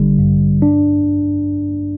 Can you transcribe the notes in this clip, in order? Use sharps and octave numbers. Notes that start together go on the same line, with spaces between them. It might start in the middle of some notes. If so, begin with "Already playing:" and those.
Already playing: A1 D3 G3
G2
D4